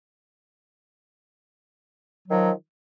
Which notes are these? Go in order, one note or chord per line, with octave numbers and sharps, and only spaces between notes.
D#3 F3 F#3